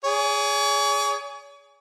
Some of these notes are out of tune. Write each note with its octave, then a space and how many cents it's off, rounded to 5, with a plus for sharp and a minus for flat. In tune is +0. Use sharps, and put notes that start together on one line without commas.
G#4 +0 C#5 +40